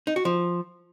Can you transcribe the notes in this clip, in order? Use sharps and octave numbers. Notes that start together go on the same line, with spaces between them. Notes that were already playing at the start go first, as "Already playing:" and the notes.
D#4
F#4
F3